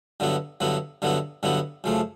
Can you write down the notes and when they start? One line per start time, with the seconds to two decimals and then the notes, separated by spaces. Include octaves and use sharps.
0.20 G2 D3 F#3 B3 E4
0.60 G2 D3 F#3 B3 E4
1.02 G2 D3 F#3 B3 E4
1.43 G2 D3 F#3 B3 E4
1.84 F#2 C#3 F3 A3